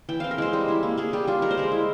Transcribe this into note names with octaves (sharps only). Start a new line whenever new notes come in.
E3 G5
C4 F5
A#4
G#3 C5
G3
E4
A#3
A#3 G#4
G3 G4
G3 F4
G#3 A#4
C5
G#3 A#4
E4